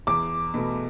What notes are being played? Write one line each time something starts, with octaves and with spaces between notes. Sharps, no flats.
E2 D6
B2 A3